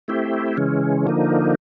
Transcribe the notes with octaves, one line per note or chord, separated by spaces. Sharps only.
A3 C4 E4 G4
C#3 E3 G#3 C#4
D3 F3 A#3 D#4